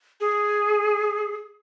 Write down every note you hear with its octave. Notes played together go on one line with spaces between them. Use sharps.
G#4